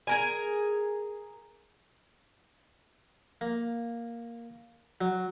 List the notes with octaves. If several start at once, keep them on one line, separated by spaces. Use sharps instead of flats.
G#4 A#4 G#5
A#3
F#3